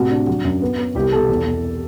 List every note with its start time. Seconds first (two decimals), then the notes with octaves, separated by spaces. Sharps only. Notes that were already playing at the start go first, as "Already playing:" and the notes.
Already playing: A2 C3 F#4
0.11 D4
0.27 F#3 F#4
0.44 F#2
0.62 B3
0.78 B3
0.95 C2 G4
1.12 B2 A4
1.29 E2
1.46 E2